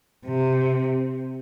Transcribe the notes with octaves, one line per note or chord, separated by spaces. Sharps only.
C3